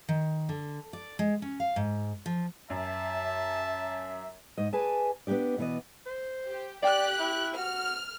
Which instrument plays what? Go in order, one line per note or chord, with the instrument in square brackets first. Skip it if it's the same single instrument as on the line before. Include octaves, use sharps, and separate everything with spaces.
[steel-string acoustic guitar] D#3
D3
D5
G#3
C#4
F5
G#2
F3
[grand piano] F#2 [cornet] E5 [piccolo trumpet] A5
[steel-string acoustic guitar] G#2 D#5
G#4 B4 D5 G#5 A5
B3 D4 D#4 G4 D5
B2 E3 B3 D5 D#5
[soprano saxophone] C5
[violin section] G4
[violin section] G4 F#6 [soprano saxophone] D5 [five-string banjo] F5 G5
[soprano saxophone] E4
[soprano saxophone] F#4 [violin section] F6